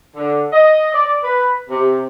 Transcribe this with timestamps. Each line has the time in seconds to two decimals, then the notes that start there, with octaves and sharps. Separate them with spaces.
0.16 D3
0.53 D#5
0.94 D5
1.23 B4
1.70 C3